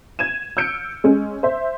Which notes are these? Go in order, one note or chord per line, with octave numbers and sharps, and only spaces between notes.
G#6 D#7 E7
E6 F6 G6 C#7 D7
G#3 C#4
C5 E5